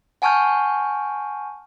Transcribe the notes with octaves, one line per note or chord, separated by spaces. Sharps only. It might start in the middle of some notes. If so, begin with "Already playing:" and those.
F#5 G#5 A5 C#6 F6 G6